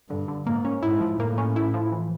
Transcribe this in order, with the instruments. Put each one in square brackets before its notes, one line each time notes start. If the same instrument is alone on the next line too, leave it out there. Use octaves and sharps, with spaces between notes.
[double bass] G2 [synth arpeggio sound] D3
[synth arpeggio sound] D3
[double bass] G#2 [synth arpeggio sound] A#3
[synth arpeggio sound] C#4
[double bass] G#2 [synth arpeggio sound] E4
[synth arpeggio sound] F3
[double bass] A2 [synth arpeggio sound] A#3
[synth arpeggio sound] C#4
E4
F3
E3